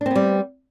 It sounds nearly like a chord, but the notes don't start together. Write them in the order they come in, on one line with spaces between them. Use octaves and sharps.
D4 C4 B3 G3